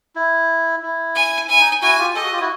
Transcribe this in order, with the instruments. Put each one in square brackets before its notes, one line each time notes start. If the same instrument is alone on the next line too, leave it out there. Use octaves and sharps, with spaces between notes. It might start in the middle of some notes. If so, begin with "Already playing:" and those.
[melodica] E4
E4
[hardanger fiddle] G#5
[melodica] E4 [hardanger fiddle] G#5
[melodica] D#4
[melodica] E4 F#4 [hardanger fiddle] G#5
[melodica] F4 G4
[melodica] G4 A4 [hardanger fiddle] D#5
[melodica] F#4 G#4
F4 G4
E4 F#4